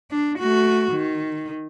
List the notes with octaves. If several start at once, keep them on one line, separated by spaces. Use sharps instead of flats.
D4
A3 F#4
D#3